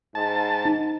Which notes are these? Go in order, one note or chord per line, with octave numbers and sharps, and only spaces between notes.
G#2 A5
D#4